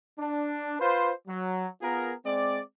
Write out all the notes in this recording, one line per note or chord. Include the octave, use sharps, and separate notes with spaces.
D4
F4 B4 C5
F#3
B3 F4 G#4 A#4
G#3 C4 D5